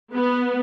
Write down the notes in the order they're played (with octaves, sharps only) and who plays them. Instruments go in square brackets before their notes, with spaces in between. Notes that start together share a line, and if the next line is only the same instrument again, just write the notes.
[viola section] B3